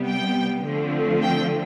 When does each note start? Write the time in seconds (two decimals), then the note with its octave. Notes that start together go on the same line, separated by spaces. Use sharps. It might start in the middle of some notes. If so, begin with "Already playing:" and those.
Already playing: C3 G3 B3
0.09 G5
0.65 D3 F3 A3 C4
1.23 G5